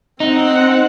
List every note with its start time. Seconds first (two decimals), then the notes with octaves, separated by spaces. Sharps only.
0.20 C4 D#4 F#5